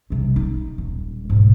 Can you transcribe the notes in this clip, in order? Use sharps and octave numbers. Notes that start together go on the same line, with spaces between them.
C3 G3
D#4
D#1
G#2 B2